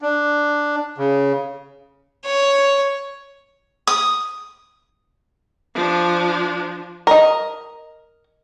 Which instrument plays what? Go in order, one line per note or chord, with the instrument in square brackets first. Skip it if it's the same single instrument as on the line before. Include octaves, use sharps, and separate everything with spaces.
[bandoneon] D4
C#3
[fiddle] C#5
[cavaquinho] D#6
[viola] F3 D4
[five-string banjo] A#4 D#5